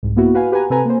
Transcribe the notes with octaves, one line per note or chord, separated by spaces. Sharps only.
C2 G#2
A#3 B3 E4 F#4
F#4 B4 F5 G#5
G4 B4 F#5 G#5 A#5
C3 C4 A4 B4 G#5 A#5
A#3 C5